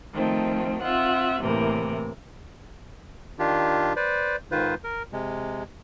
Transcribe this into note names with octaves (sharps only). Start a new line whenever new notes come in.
D#3 F3 A3 C4 D#4
C4 F4 E5 F#5
A2 C3 E3 A#3 A#4
D#3 D4 F4 G4
B4 C5 D5
G#2 D#3 F4 B4 C5
A#4
C3 G#3